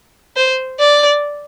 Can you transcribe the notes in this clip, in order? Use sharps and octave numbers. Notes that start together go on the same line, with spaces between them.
C5
D5